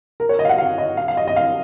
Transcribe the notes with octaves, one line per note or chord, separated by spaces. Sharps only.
A#4
C#5
D#5
F5
F#5
F5
D#5
F5
F5
D#5
D#5
F5